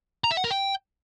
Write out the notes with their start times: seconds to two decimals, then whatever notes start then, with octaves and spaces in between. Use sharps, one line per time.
0.24 A#5
0.31 E5
0.37 F#5
0.44 A#4
0.51 G5